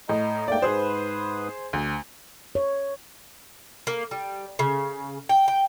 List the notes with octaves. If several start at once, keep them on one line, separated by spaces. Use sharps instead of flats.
A2 D#5 A#5
G#2 A3 A#3 D5 G5
G#2 G#4 B4 C5 D#6
D2
C#5
A#3
G3
C#3
G5
G5